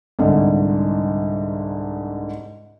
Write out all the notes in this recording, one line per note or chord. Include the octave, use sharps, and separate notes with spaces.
C2 G#2 D3